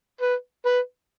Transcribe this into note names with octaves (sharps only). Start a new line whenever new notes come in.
B4
B4